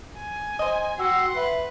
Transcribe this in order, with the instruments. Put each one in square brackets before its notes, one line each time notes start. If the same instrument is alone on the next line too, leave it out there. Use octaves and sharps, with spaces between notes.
[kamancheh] G#5
[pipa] C5 D#5
[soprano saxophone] F#4 [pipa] G4 [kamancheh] F#5 C6 [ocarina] E6
[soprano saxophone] B4 [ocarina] E5